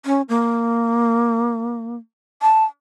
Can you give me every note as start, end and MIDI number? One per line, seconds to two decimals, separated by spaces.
0.06 0.22 61
0.29 1.95 58
2.42 2.64 81